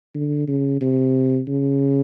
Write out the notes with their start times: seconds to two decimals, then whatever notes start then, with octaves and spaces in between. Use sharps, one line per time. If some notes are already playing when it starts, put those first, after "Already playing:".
0.14 D3
0.48 C#3
0.81 C3
1.47 C#3